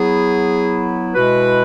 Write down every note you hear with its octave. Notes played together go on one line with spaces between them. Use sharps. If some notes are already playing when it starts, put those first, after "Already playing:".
Already playing: F#3 B3 E4 G#4
B2 G#3 E4 F#4 B4